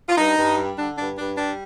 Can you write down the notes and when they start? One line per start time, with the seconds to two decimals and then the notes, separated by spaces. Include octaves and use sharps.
0.09 F4
0.17 G2 D#4
0.37 G2
0.57 G3
0.78 D3 D4
0.98 G2 D4
1.18 G2 D4
1.37 G3 D4